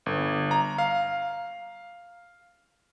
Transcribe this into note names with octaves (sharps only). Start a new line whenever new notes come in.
G1
A#5
F5